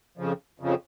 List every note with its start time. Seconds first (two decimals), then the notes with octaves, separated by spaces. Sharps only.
0.18 F2 C#3 F3
0.60 F2 C#3 F3